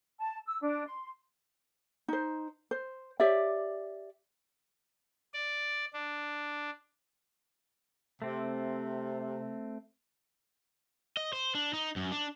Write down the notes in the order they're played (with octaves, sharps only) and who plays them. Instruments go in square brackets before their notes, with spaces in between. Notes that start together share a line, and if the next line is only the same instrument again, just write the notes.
[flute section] A5
E6
D4
C6
[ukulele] D#4 C5
C5
G4 C#5 D5 E5
[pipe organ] D5
D4
[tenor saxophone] C3 [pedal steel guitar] A3 C4
[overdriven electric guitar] D#5
C5
D4
D#4
F#2
D4